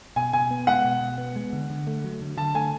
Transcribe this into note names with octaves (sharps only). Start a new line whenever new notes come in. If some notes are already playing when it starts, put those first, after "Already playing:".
B2 G#5
B2 G#5
B3
G#3 F#5
B2
B2
B3
G#3
D3
D3
A3
F#3
D3
D3 A5
A3 G#5